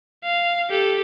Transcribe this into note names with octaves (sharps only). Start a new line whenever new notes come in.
F5
G4 A4